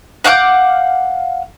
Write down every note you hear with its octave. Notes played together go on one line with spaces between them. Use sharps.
F5 F#5 D6 G6